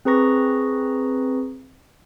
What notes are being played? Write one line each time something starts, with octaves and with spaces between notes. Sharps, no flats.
C4 G#4 B4 A#5 C#6 A#6